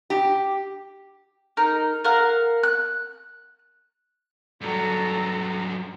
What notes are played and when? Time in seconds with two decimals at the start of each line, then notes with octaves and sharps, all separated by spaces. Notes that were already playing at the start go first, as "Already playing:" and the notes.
0.10 G4
1.57 D#4 A#4
2.04 A#4 F5 F#5
2.63 F#6
4.61 G2 F#3 A4 A#5